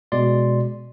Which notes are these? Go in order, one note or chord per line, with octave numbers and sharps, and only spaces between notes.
B2 G#3 D5 C6